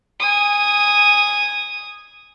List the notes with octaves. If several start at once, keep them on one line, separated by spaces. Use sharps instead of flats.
G#5 D#6